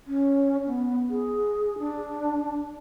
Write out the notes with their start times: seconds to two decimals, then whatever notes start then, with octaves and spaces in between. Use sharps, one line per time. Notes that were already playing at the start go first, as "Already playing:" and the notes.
0.07 C#4
0.67 B3
1.10 G#4
1.79 D4